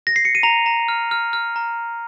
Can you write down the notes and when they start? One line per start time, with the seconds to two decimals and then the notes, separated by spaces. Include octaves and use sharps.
0.07 A#6
0.16 C7
0.25 C#7
0.35 D#7
0.43 A#5 F7
0.66 A#5
0.88 F6
1.11 F6
1.33 F6
1.56 A#5